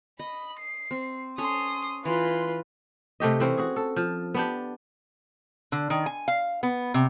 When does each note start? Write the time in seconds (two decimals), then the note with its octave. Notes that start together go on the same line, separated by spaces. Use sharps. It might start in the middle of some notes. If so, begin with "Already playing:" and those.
0.19 D#5 B5
0.60 C7
0.91 C4
1.38 C#4 A4 C6 D#6
2.05 E3 F4 B4 C6
3.20 C3 A3 G4 D#5
3.40 E3 C4 C#4
3.58 F#4 G#4
3.76 A4
3.96 F3
4.34 B3 D4 G4
5.72 D3
5.90 D#3
6.06 G#5
6.28 F5
6.63 B3
6.94 C3